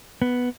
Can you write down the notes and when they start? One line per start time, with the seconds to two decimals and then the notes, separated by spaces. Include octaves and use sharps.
0.22 B3